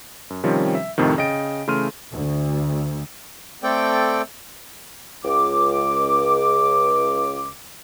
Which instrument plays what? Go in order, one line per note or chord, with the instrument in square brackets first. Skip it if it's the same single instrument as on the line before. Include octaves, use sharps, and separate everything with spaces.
[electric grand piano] F#2
C3 D#3 F3 G3 C4 C#4
E5
F2 A2 C3 D#3
C#3 D#5 G5 A6 D7
C#3 E3 A3 C6 F6 D#7
[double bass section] D2
[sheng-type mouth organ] A3 C4 A4 D5 G5
[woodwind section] C#2 D6